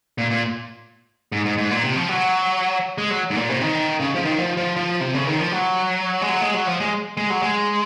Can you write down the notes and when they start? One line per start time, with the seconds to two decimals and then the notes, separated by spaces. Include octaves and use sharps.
0.18 A#2
0.30 A#2
1.32 G#2
1.45 G#2
1.58 G#2
1.71 A#2
1.84 C3
1.96 F3
2.09 F#3
2.98 G#3
3.11 F#3
3.31 G#2
3.35 A#2
3.49 C3
3.61 D#3
4.00 C#3
4.15 F3
4.25 D#3
4.38 F3
4.57 F3
4.76 F3
5.01 C3
5.14 C#3
5.27 D#3
5.40 F3
5.52 F#3
6.21 G#3
6.29 F#3
6.41 G#3
6.54 F#3
6.67 F3
6.80 G#3
7.17 G#3
7.30 F#3
7.43 G#3